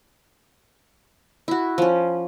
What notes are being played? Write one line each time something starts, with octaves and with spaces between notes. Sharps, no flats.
E4 F#4
F3 C#4